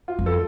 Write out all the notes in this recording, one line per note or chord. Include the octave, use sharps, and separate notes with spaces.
F4
F2
A4